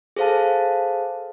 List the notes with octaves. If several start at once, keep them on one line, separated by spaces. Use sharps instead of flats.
G#4 A4 C5 F5 A5